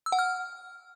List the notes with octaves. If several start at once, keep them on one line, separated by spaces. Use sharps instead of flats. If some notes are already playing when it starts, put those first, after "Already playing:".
E6
F#5
F6